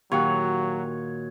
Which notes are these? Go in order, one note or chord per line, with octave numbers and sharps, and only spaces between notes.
A#2 D#3 F#3 F#4 G4 C#5 F5 G5